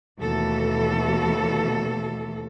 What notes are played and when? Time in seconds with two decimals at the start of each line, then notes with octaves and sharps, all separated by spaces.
0.21 D#2 B2 E3 A3 A4